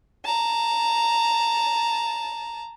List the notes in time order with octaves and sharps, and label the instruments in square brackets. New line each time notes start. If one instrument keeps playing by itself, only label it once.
[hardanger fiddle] A5 A#5